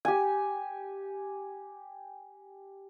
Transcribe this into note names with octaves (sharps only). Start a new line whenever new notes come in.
G4 G#5